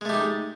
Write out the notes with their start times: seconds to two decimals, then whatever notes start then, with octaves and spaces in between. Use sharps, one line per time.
0.01 G#3
0.05 A3
0.09 G4
0.13 D#4